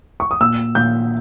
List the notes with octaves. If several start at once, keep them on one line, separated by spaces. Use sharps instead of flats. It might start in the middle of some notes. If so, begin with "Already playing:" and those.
C#6
D#6
A#2 E6
A#2 G6